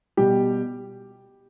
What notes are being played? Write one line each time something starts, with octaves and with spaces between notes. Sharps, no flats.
B2 G3 G4